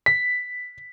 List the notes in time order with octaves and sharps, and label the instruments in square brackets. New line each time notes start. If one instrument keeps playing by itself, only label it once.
[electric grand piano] B6